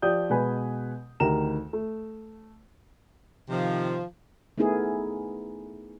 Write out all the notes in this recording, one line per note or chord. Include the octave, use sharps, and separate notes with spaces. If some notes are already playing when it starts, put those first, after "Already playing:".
F3 G4 D5 D#6 G6
B2 G#3 B4 G#5 B5
D2 D#3 G4 A#4 A#5 E7
A3
C3 D#3 F3
A3 B3 D#4 E4 G#4 A#4